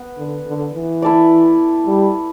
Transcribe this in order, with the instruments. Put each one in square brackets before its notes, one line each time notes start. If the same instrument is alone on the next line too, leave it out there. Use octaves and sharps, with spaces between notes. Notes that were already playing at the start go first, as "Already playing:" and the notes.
Already playing: [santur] B3
[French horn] D3
D3
E3
[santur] E4 A4 D5
[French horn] G3